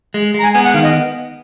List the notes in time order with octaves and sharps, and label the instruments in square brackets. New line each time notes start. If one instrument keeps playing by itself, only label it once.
[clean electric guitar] G#3
[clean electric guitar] G#3 [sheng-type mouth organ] A#5
[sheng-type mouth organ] G#5
[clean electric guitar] B3 [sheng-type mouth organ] G#5
[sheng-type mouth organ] F#5
[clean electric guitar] D#3 [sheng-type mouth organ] F5
[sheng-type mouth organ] D#5